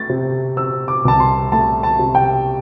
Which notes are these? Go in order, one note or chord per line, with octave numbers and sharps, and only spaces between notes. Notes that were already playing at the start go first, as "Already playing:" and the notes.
Already playing: A3 A6
C3
C4 E6
D6
C2 A5
C6
A3 A5
A5
C3
G5